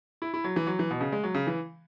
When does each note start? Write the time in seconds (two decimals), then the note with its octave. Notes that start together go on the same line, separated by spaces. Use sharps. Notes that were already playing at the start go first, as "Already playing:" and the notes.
0.22 E4
0.34 E4
0.44 F#3
0.56 E3
0.67 F#3
0.79 E3
0.91 B2
1.01 C#3
1.12 G#3
1.24 F#3
1.35 C#3
1.47 E3